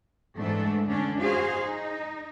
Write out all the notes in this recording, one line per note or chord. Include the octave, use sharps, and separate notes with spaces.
G#2 E3 A3 D4 A4
D3 C#4 D4
F#4 G#4 C5 F5
D#4